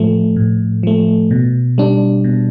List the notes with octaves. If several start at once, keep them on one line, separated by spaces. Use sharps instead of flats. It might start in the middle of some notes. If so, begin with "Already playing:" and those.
Already playing: A2 F3 A3
A2
F3 A3
B2
G3 D4
B2